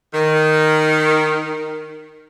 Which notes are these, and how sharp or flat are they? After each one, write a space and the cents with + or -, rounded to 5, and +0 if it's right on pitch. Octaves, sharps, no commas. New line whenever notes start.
D#3 -5